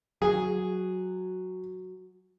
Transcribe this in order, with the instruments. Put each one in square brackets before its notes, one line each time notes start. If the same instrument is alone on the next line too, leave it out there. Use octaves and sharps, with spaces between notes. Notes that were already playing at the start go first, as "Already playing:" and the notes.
[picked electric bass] F#3 [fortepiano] G#4